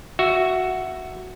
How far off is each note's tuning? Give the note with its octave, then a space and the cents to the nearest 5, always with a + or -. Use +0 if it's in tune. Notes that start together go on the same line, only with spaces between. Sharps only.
F#4 +0 E5 +5